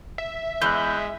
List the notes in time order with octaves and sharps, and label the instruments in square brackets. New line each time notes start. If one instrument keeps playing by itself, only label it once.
[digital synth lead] E5
[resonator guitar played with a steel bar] E2 [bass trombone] G#3 [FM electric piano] F#6 G6